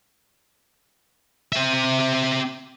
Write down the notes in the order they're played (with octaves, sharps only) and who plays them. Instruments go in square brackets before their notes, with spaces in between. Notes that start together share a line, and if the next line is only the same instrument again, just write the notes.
[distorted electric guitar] C4 E5